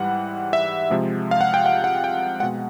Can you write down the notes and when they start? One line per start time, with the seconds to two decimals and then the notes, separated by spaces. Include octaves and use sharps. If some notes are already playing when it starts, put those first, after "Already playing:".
Already playing: G#2 E3 G3 F#5
0.53 E5
0.90 C3 F3 G#3
1.31 F5
1.41 F#5
1.54 G5
1.66 F#5
1.84 F#5
2.04 G5
2.40 B2 G#3 F#5